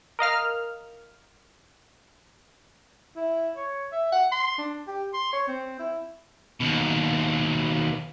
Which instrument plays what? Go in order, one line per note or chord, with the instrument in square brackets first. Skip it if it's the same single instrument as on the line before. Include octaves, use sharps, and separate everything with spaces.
[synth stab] A#4 D#5 F5 F6
[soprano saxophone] E4
C#5
E5
F#5
C6
D4
G4
C6
C#5
C4
E4
[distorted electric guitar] D#2 B2